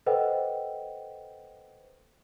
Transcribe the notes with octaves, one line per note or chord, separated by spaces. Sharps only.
A4 B4 C5 D#5 F#5 G5